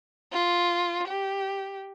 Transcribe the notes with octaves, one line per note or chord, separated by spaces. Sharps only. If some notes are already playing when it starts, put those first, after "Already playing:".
F4
G4